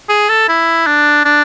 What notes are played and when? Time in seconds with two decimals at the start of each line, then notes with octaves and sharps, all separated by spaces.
0.09 G#4
0.29 A4
0.49 E4
0.86 D4
1.25 D4